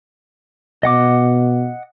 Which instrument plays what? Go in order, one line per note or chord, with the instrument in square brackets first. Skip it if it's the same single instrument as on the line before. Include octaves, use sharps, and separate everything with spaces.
[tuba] B2 [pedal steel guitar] D#5 F#5 D6